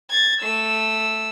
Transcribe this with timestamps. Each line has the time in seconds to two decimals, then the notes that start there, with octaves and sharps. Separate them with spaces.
0.11 G#6 A6
0.41 A3 E6